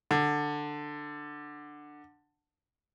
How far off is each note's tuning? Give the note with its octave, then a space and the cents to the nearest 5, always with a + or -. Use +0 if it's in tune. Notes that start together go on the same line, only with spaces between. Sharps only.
D3 +10